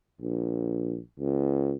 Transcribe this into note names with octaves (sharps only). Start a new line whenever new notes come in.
A#1
C#2